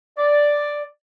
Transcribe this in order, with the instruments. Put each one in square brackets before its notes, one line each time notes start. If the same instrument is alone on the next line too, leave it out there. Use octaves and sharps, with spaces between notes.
[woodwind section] D5